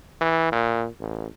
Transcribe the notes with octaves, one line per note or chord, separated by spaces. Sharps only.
E3
A#2
A1